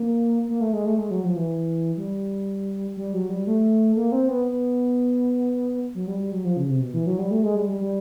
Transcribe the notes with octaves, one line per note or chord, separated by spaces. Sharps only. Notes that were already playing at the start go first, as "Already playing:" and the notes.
Already playing: A#3
A#3
A3
G#3
A3
G#3
F#3
F3
E3
G3
G3
F#3
G3
A3
A#3
C4
B3
B3
F#3
G3
G3
F#3
F3
C#3
C3
B2
E3
F#3
G3
A3
G#3
G3
G3
G3